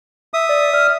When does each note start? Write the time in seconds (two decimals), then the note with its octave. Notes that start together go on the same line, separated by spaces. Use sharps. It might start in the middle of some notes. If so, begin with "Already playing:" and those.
0.34 E5 D#6
0.49 D5
0.74 F6